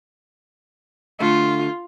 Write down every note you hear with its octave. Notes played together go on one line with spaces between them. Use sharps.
D3 A3 F4